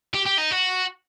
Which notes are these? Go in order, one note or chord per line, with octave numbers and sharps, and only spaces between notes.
G4
G4
D#4
F#4